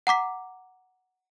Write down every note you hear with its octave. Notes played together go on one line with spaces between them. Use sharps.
F#5 A#5 D6 B6